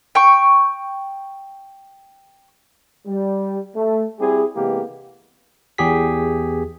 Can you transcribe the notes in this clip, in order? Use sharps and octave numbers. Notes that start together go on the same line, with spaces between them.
G5 C#6
G3
A3
G3 C4 E4 G4 G#4
C3 E3 G#3 A#3 B3 G4
E2 G4 G#4 B6